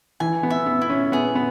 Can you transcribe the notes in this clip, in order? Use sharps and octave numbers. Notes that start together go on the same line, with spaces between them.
E3 G#5
B3
E5
B3
E4
C#4
B3 G#4
B3